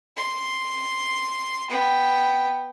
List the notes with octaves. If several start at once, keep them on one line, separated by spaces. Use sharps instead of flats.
C6
B3 G5